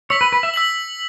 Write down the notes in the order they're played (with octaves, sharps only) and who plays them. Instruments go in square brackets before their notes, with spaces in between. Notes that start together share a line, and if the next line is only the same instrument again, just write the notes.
[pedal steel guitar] C#5 [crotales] E6 B6 F#7
[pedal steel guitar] B4
B4
E5
[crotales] E6 B6 F#7